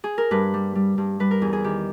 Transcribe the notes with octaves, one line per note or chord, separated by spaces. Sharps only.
G#4
A#4
G2 B4
G3
G3
G2
G3 B4
A#4
E2 G#4
G#4
D#3 G4